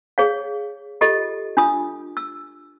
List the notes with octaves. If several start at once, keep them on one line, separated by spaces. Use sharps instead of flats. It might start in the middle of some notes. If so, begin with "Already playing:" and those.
G#4 C#5 F5
F4 G4 A4 D#5
D4 F4 D#6
E6